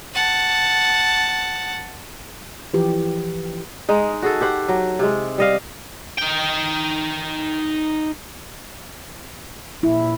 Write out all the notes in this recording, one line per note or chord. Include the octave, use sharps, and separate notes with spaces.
F#5 A5
E3 F3 G4
G#3 D#4
F#4 G#4 A4
G4 C5 F#5
F#3
C3 G#3
G3 D#5 F5
D#4 G5
A#1 E4